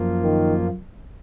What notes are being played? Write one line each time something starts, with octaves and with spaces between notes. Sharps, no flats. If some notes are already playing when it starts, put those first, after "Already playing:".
Already playing: F#2 F3 A#3 F4
D#3